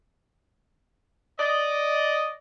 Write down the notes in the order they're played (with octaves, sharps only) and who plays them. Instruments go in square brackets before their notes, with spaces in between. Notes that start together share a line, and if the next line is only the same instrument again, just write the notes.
[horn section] D5 D#5